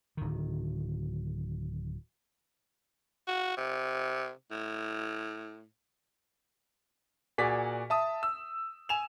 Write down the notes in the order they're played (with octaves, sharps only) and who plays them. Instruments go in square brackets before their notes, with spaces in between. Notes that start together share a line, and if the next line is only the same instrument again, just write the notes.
[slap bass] D1 D#3
[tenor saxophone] F#4
C3
A2
[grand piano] A#2 F#4 G#4 D5 B6
E5 A5 D#6
E6
G#5 E7 F7